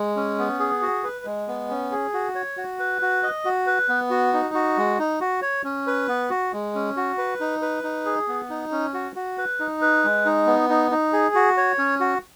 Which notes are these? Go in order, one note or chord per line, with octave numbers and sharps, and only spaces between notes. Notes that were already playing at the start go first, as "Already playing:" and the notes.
Already playing: G#3
C#4
B3
G#4
F#4
B4
G#3
B3
C#4
G#4
F#4
C#5
F#4
B4
F#4
D#5
F#4
B4
B3
F#4
D#4
F#4
G#3
D#4
F#4
C#5
C#4
B4
B3
F#4
G#3
C#4
F#4
B4
D#4
B4
D#4
G#4
B3
D#4
C#4
F#4
F#4
B4
D#4
B4
G#3
D#4
B3
D#4
D#4
G#4
F#4
C#5
C#4
F#4